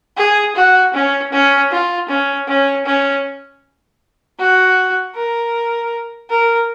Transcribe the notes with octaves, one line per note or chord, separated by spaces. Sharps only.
G#4
F#4
C#4
C#4
F4
C#4
C#4
C#4
F#4
A#4
A#4